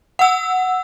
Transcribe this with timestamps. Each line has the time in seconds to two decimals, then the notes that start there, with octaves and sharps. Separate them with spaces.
0.19 F#5 E6